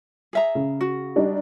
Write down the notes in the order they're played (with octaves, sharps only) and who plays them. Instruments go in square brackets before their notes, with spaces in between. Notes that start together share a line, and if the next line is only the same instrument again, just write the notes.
[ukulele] G#4 E5 A#5
[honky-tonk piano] C#3
[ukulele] F#4
[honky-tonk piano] G3 D4 D#4